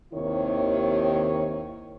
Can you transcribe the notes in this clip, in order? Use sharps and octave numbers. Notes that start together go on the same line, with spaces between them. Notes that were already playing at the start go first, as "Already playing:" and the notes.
D#2 C3 D#3 E4 C#5